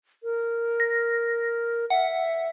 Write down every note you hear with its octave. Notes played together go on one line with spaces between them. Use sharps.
A#4
A#6
E5 F#5